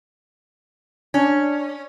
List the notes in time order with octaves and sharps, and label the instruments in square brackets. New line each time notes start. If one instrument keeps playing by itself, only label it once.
[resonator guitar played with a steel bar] C#4 [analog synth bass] D4